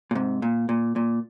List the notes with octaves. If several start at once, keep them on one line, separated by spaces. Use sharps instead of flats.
A#2
G#2 C3
A#2
A#2
A#2